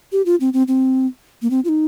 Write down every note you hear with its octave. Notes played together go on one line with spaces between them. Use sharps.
G4
F4
C4
C4
C4
A#3
C4
F4
D#4